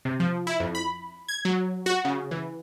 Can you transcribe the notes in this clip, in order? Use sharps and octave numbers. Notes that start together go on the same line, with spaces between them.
C3
F3
E4
F2
B5
G#6
F#3
F#4
C#3
E3